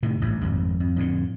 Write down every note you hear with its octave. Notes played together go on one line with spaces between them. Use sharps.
A2 C3 D#3
A1 G2
G#1 F2
F2
F2 A2 D3